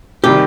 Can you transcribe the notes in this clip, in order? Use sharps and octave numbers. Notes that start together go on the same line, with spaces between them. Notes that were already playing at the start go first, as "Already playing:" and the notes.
C3 D#3 G3 G4